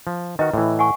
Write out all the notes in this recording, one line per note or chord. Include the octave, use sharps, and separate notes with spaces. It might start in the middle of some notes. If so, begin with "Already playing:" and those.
F3
D#3 F#4 B4 D#5 A#5
A2 E3
F#5 G#5 C#6